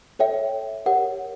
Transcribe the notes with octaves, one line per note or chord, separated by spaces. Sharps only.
A4 C#5 E5 G5
G4 A#4 C#5 F#5